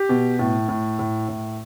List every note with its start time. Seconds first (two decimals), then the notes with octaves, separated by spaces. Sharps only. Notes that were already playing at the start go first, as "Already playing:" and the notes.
Already playing: G4
0.09 B2
0.39 A2
0.69 A2
0.99 A2
1.28 A2